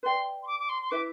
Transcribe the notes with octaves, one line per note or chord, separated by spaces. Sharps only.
B4 D5 G5 C6
C6
D6
D6
C6
C6
E4 B4 E5 D6